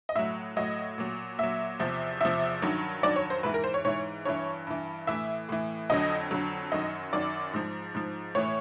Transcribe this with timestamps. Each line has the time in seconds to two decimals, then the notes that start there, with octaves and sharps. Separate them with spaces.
0.09 D#5
0.15 A2 F#3 E5
0.57 A2 F#3 D#5
0.98 A#2 F#3
1.38 A#2 F#3 E5
1.80 E2 C3 F3
2.21 E2 C3 F3 E5
2.62 G2 D#3 F#3
3.03 G2 D#3 F#3 D5
3.16 C#5
3.30 C5
3.43 G#2 E3 B4
3.54 A#4
3.64 C5
3.74 C#5
3.85 G#2 E3 C#5
4.25 G2 E3 C#5
4.67 G2 E3
5.07 A2 E3 E5
5.49 A2 E3
5.90 F2 D3 F#3 D#5
6.31 F2 D3 F#3
6.72 F#2 D#3 F#3 D#5
7.13 F#2 D#3 F#3 D5
7.54 G#2 F3
7.95 G#2 F3
8.35 A2 E3 C#5